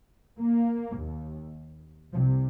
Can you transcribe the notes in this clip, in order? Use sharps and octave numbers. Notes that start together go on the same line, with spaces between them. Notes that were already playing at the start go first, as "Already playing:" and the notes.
A#3
D#2
C2 C3 F3